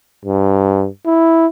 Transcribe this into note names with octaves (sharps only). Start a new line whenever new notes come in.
G2
E4